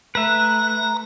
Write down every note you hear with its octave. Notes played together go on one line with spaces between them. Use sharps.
A3 B4 E5 A#5 F#6